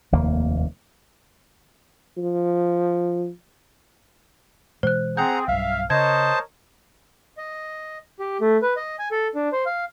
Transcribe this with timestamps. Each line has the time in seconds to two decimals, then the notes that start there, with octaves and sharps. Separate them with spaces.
0.12 F1 D#2 A#3
2.17 F3
4.83 B2 E3 G#3 C5 F#6
5.17 C4 G#4 F#5 G5 A#5 G6
5.48 B1 G2 E5 F5
5.90 C#3 A#4 C5 C#5 D#5 A5 G#6
7.37 D#5
8.19 G4
8.41 A3
8.62 B4
8.77 D#5
8.99 G#5
9.11 A4
9.35 D4
9.52 C5
9.66 F5